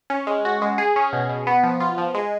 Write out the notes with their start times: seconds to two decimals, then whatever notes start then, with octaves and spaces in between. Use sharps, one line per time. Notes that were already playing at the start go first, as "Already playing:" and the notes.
0.10 C#4
0.27 G#3
0.45 F#4
0.62 G#3
0.78 G#4
0.96 C#4
1.13 B2
1.29 B2
1.47 B3
1.64 F3
1.80 F4
1.98 F3
2.14 G#3